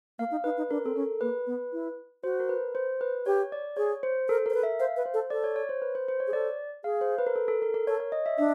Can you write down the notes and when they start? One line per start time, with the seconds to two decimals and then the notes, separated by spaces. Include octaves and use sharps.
0.19 A#3 F5
0.31 D#4
0.44 D#4 B4
0.57 D#4
0.70 D4 A#4
0.85 C4 A4
0.95 C#4 A#4
1.21 A#3 B4
1.47 B3
1.73 E4
2.24 F#4 C5
2.40 A#4
2.49 B4
2.75 C5
3.01 B4
3.26 G4 C#5
3.52 D5
3.77 G#4 C#5
4.03 C5
4.28 A4 A#4
4.46 A#4 C5
4.54 B4
4.63 E5
4.80 C5 F5
4.96 B4
5.06 C5
5.14 A4
5.30 A4 D5
5.44 C#5
5.56 C#5
5.69 C5
5.82 B4
5.95 C5
6.08 C5
6.20 C#5
6.27 G#4
6.33 A4 D5
6.84 G#4 F5
7.01 C5
7.18 B4
7.26 A#4
7.36 A4
7.48 A4
7.62 A#4
7.74 A#4
7.87 A4 C#5
8.00 C#5
8.12 D#5
8.26 E5
8.38 D4 E5